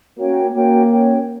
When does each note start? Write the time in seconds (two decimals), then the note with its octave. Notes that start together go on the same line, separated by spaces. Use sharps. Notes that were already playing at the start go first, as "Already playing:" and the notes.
0.18 A#3 C#4 F#4 C#5 G5
0.53 A#3 C#4 F#4 C#5 G5
0.90 C#4 F#4 C#5 G5